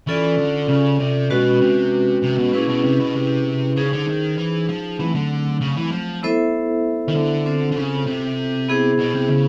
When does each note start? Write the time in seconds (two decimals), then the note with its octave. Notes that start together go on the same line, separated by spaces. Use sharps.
0.07 E3 C#4 F4 A4 D5
0.38 D3
0.69 C#3
1.00 C3
1.30 B2 G#3 C#4 F#4 B4
1.61 C3
2.23 C3
2.38 B2
2.53 A#2 C#4 E4 G#4 B4
2.69 B2
2.84 C3
3.00 B2
3.15 C3
3.76 C#3 D#4 G#4 C5
3.92 D3
4.07 D#3
4.38 E3
4.69 F3
4.99 E3 F#3 A3 C4
5.15 D3
5.61 C#3
5.76 E3
5.92 F3
6.23 B3 E4 A4 C5 E5
7.08 D#3
7.15 D3
7.46 C4 F4 A4 C5
7.72 D3
7.76 C#3
8.07 C3
8.68 B3 E4 G#4 C5
8.99 B2
9.15 C3
9.30 C#3